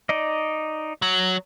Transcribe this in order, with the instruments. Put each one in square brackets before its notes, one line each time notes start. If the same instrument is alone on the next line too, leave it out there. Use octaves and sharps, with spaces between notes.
[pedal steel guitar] D#4 D5 D#5
[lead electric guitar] F#3